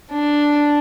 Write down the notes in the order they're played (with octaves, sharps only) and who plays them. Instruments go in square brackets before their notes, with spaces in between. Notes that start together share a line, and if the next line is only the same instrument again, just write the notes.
[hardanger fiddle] D4